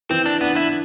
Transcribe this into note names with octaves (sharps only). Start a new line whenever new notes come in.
E3 C4
D4
B3 D4
E4